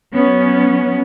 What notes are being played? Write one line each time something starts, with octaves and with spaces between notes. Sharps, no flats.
F#3 B3 C#4